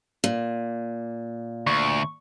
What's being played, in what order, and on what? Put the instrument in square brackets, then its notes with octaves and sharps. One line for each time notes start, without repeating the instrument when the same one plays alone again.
[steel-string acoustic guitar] A#2
[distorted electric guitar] D2 [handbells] C#6